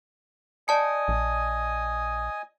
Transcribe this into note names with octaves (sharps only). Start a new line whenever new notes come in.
D5 D#5 G#5 A5 D#6 C#7
A#1